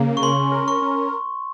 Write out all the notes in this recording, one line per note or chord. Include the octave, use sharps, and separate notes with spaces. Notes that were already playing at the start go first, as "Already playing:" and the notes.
Already playing: C#3 A#3
C#6
C#4 C6
A#4
C#6
C#4